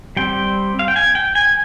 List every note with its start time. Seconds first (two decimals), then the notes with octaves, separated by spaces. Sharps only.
0.17 G3 C4 G5
0.79 F5
0.88 G5
0.96 G#5
1.15 G5
1.35 G#5